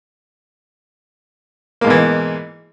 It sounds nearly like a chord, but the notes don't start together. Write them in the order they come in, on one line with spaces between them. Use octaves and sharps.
A#3 G#2 B2 E3